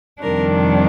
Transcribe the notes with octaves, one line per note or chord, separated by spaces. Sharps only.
F2 C3 D#3 G3 D4 A#4